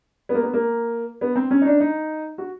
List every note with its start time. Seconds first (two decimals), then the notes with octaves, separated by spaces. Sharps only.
0.29 B3
0.34 A#3
0.43 B3
0.53 A#3
1.21 B3
1.36 C4
1.51 C#4
1.61 D#4
1.66 D4
1.80 D#4
2.38 F#4